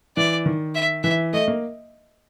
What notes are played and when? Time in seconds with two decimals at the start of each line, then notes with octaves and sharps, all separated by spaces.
0.17 E3 D5
0.46 D#3
0.75 E5
1.03 E3 E5
1.33 A3 D#5
1.48 A#3